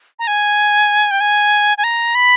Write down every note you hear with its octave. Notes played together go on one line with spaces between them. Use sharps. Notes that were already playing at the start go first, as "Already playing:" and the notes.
A#5
G#5
G5
G#5
G#5
A#5
B5